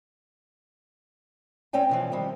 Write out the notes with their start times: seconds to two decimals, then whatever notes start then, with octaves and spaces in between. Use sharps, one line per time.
1.73 C4 C#4 D5 G5 G#5
1.89 B2 E3 F3
2.12 D#3 G3 C4